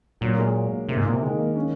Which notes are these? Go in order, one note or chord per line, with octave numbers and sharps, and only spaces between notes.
A#2 F#3
A#3
G#3
C3 A#3
G#2
A#2 A#3
C3
D#3 G#3
A#3
C#4